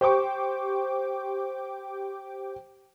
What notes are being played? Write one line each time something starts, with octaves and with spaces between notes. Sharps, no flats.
G4 C5 G5 C#6 D6